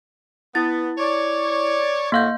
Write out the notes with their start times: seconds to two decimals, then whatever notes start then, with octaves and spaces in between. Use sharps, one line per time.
0.55 B3 E4 A6
0.98 C#5 D5
2.12 A2 A#3 F#4 F5 G6